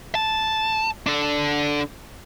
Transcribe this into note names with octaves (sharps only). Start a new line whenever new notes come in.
A5
D4 A4